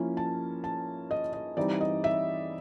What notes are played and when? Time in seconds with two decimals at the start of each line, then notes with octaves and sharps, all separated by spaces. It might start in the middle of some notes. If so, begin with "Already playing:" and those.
Already playing: F3 A#3 C#4 E4
0.17 A5
0.64 A5
1.11 D#5
1.34 D#5
1.57 E3 G3 C4 D#4 D5
1.81 D#5
2.04 E5